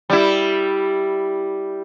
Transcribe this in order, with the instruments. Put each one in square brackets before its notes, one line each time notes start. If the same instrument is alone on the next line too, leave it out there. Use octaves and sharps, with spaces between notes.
[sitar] G3 E4